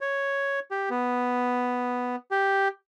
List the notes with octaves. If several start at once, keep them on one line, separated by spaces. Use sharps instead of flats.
C#5
G4
B3
G4